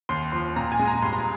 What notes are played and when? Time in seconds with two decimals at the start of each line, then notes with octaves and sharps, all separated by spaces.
0.09 D#2 C6
0.32 F3 C6
0.56 A#2 A#5
0.72 G#5
0.79 G#3
0.87 A#5
1.02 G2 C6
1.13 A#5